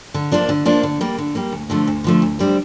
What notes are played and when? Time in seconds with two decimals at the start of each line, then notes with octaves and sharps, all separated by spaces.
0.14 D3
0.32 F3 A#3 D4 F4
0.49 D3
0.65 F3 A#3 D4 F4
0.83 D3
1.01 G3 A#3
1.18 D3
1.35 G3 A#3
1.52 D2
1.70 D3 F3 A3
1.87 D2
2.04 D3 F3 A3
2.22 D2
2.39 D3 G3 C4